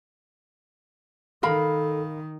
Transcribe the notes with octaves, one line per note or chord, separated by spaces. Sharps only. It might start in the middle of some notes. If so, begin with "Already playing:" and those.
D#3 A4 A#4 F5 B5